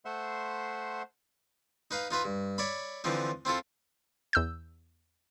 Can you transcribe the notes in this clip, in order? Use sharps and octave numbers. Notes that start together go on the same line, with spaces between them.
A3 C5 E5 F#5 C6
D#4 B4 F5
D#4 F4 B4 E5
G2
C#5 D5 E5 B5
D3 E3 F3 C4 D#4
C4 E4 F4 A4
E2 E6 G6